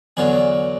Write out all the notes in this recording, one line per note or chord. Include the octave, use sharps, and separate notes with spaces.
E2 D3 F#3 G#4